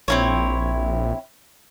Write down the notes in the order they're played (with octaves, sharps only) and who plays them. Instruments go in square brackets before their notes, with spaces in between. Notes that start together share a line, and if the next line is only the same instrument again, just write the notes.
[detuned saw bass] A#1 [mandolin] C4 E4 C#5